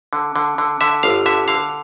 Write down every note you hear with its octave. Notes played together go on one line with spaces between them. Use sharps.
D3
D3
D3
D3 E5
G1 F5
D3 E5
D3 F5